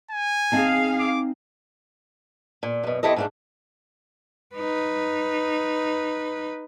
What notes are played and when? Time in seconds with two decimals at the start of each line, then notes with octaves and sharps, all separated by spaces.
0.11 G#5
0.52 C4 D#4 G#4 F5 A5
0.99 D6
2.63 A#2
2.84 F#2 B2
3.03 F2 E4 G4 A4 D#5
3.16 G#2 A3 D4
4.55 D#4 B4